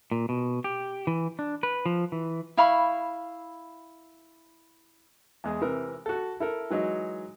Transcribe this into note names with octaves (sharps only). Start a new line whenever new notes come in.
A#2
B2
G4
E3
D4
B4
F3
E3
E4 F5 B5 C#6
E2 G#3 G#4
C3 E3 A#4
F#4 A4
E4 A4 A#4
E3 F#3 G#3 D#4